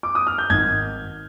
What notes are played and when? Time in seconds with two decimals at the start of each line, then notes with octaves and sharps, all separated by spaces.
0.03 D6
0.15 D#6
0.27 F6
0.38 G6
0.50 G#1 G#6